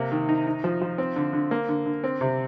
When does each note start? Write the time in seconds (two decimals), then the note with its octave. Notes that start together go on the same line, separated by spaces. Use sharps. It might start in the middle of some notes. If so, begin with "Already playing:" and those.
Already playing: C3 A#3
0.12 D#3
0.29 D#4
0.47 D#4
0.64 F3
0.82 F3
0.98 C4
1.16 D3
1.33 D3
1.51 A#3
1.69 D3
1.86 D3
2.04 C4
2.21 C3